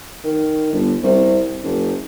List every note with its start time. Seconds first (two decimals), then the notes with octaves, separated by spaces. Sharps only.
0.24 D#3
0.72 G1
1.03 C2
1.63 F#1